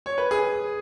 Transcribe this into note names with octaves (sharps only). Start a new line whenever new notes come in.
C#5
B4
G#4